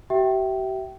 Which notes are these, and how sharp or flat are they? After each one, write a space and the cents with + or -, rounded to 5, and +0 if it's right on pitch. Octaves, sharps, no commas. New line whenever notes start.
G4 -45 E5 +0 G5 -20